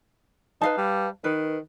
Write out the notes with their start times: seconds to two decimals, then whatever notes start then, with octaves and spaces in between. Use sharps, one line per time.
0.61 D#4 B4 F5 A5
0.78 G3
1.24 D#3 B4